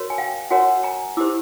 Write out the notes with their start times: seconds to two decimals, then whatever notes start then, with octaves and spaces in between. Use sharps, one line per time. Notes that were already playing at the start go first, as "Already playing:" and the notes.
Already playing: F#4 A#4 C#5
0.10 G#5
0.18 F5 G5
0.51 F#4 A#4 C#5 F#5 G#5
0.83 G#5 A#5
1.17 E4 G4 C5 D6 E6